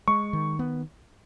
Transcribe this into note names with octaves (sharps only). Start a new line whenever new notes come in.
G#3 C#6
D#3
B3